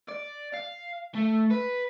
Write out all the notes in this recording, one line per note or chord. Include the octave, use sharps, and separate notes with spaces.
D5
F5
A3
B4